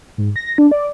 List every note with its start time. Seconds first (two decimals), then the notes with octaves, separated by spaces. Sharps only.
0.18 G#2
0.36 A#6
0.58 D4
0.71 D5